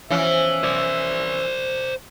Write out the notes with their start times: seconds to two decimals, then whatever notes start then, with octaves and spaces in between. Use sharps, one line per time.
0.10 E3 F3 B3 C#4 F#4 E5
0.64 C5 D5